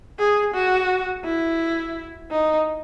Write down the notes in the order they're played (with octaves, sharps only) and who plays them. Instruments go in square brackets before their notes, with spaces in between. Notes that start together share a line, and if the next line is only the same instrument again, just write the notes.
[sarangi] G#4
F#4
E4
D#4